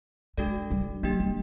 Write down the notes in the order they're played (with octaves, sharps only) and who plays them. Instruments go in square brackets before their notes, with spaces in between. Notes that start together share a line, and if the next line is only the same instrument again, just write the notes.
[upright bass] G#3 [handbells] D4 F#4 A4 D5
[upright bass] G3
[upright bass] F#3 [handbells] A#3 D4 G4
[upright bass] G3